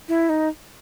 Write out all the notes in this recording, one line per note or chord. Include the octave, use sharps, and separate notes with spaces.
E4
D#4